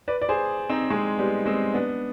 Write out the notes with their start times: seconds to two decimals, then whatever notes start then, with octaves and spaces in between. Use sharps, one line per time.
0.08 B4 D5
0.22 D5
0.29 G#4 C5
0.70 C4 D#4
0.90 G#3 C4
1.18 G3 B3
1.46 G#3 C4
1.74 B3 D4